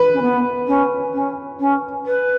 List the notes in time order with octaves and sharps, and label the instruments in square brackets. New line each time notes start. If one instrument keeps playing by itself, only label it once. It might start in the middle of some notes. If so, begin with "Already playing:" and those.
Already playing: [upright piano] B4
[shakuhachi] C#4
B3
C#4
C#4
C#4
B4